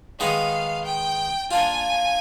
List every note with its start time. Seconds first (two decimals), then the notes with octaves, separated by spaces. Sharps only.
0.20 D#3 G#3 B3 D#4 F5
0.85 G5
1.51 A#3 D4 F4 G#5